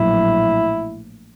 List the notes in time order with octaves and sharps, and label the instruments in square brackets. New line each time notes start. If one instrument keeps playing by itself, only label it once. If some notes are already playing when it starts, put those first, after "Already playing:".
Already playing: [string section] A#1 A2 F#3 [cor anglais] E4